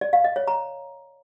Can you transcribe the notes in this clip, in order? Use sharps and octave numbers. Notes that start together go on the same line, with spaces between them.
D5
F5
D#5
C#5
A#5